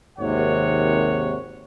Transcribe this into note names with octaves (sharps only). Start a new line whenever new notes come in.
G#1 D#2 C3 C#5 F#5